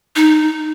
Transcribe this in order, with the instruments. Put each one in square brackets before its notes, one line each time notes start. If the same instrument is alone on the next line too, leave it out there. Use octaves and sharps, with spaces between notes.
[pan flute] D#4